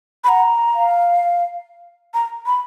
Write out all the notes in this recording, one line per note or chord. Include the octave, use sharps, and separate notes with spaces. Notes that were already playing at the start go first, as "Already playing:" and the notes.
B5
F#5 A#5
F5
A#5
B5